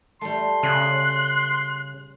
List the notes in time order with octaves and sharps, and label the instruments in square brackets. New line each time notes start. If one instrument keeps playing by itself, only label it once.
[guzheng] G3 A3 [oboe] C6
[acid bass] C#3 [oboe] C6 [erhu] F#6